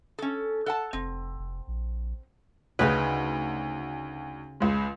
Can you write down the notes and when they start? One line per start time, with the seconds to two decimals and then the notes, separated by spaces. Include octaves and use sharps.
0.19 C#4 A4
0.66 A4 F#5 A5
0.93 F1 C4
1.38 F1
1.67 A#1
2.79 D2 C#3 D#4 B4
4.60 C#2 G#3